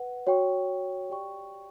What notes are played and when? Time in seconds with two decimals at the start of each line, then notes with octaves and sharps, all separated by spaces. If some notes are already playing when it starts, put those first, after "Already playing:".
Already playing: B4 F#5
0.27 F#4 C#5 G5 C#6
1.10 G4 D5 G5 C#6